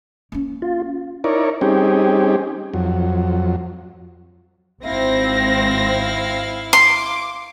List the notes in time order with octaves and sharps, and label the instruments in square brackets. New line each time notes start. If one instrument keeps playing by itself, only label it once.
[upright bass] A#3 C#4
[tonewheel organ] F4
[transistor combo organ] D#4 E4 A#4 C#5 D5
G3 C4 C#4 D#4 G4 G#4
F2 F#3
[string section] G#1 C4 A#6 [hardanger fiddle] E4 F5
[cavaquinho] C6 [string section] D6